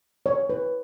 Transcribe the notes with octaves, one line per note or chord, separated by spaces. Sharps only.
C#5
B4